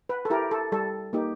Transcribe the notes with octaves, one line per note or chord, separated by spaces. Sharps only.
B4
A4
E4 G4 A#4
A4
G3 A4
A#3 D#4 G4